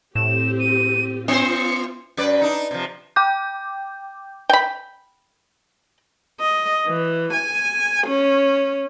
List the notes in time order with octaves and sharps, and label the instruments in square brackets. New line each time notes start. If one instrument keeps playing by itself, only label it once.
[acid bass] A2 [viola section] C4 G4 [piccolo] E7
[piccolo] D#7
[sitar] B3 C5 [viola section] F4 [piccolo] C#7
[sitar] F#2 B4 D5
D4 D#4
C3 F3
[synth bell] G5 D6 G6
[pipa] G5 B5
[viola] D#5
E3
G#5
C#4